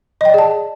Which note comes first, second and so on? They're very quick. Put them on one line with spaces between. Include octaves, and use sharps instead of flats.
D#5 G5 D5 G#4 A5